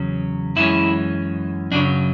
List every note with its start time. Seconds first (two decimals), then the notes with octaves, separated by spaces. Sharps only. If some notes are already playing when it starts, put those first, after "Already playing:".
Already playing: E2 C#3 F#3 C#4
0.56 F#2 E3 G#3 C#4 E4
1.72 F#2 C#3 F#3 D4